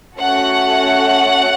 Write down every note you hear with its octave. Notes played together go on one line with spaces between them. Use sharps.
A3 C#4 F#4 A4 F#5